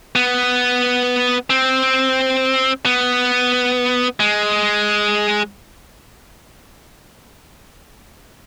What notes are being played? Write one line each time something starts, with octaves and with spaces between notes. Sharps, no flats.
B3
C4
B3
G#3